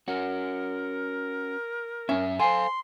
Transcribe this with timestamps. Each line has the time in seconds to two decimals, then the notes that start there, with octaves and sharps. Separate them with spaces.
0.08 C#4 F#4 A#4
2.09 F#2 C#4 E5
2.39 A4 C5 F5 G#5 C6